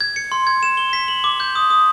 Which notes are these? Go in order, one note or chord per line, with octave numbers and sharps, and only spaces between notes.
G#6
C#7
C6
G#6
E7
G7
B6
F#7
D6
G6
D#6
D#6